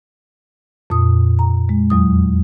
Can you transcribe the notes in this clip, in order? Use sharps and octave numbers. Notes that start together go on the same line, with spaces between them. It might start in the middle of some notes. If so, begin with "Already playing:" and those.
F2 A#2 D#6
A#5
G#3
E2 F#3 D#6